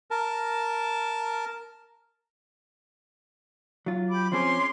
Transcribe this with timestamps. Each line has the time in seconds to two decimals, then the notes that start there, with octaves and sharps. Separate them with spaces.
0.11 A#4 A5
3.86 F#3 F4
4.09 G4 B5 D6
4.32 F3 C4 C#4 G#4 C6 D6